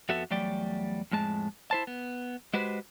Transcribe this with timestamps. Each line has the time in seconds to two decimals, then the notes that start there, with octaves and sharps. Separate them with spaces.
0.09 F2 B3 F#4 A4 E5
0.30 E2 F#3 G3 A3 D5 G5
1.11 F2 A2 G#3 A5
1.71 E4 C5 A5
1.87 B3
2.53 G#3 F#4 G4 B4 C5